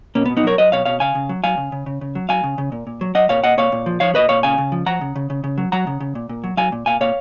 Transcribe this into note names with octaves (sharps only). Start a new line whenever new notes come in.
B2 A#3 C#4
B3
B2
B3 D#4
F#3 A#4 C#5
F#3 B4 D#5
B2 C#5 F5
B2 C#5 F5
C#3 F5 G#5
C#3
F#3
F#3 F5 G#5
C#3
C#3
C#3
C#3
F#3
F#3 F5 G#5
C#3
C#3
A#2
A#2
F#3
F#3 D#5 F#5
A#2 C#5 F5
A#2 D#5 F#5
A#2 C#5 F5
A#2
F3
F3 C#5 F5
A#2 B4 D#5
A#2 C#5 F5
C#3 F5 G#5
C#3
F3
F3 F#5 A#5
C#3
C#3
C#3
C#3
F#3
F#3 F#5 A#5
C#3
C#3
A#2
A#2
F#3
F#3 F5 G#5
A#2
A#2 F5 G#5
A#2 C#5 F5